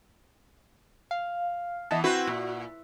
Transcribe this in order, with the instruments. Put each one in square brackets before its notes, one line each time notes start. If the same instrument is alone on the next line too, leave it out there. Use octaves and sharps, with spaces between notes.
[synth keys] F5
[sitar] E3 B3 [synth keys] E4 D#5 A5
[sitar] C4 E4 B4 [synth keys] F#4
[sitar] A#2